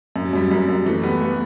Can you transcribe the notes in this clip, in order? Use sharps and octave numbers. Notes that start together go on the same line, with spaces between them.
F#2
F#3
F#2 G3
F#3
F#2 G3
F#2
E3 A3
G3 B3
A3 B3